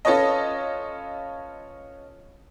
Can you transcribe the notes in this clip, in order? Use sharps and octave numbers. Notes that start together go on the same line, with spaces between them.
C#4 F4 A4 B4 C#5 D#5